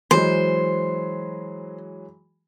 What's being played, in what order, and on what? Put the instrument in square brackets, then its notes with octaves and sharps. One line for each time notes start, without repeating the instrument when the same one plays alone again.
[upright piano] E3 F#3 G#3 [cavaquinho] C5